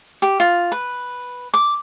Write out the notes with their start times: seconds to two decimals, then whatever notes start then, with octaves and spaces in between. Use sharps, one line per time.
0.22 G4
0.40 F4
0.72 B4
1.54 D6